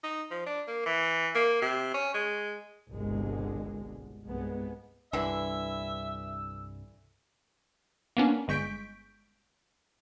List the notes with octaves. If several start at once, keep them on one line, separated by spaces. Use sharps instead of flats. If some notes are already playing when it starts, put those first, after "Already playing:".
D#4
F3
D4
A#3
E3
A#3
C3
C#4
G#3
G1 C2 B2 D3 G#3
C2 G2 G#3 B3
C2 G2 D3 E3 E4 E5 E6
A#3 B3 C#4 D4
G1 G#3 C#6 G6 B6 D7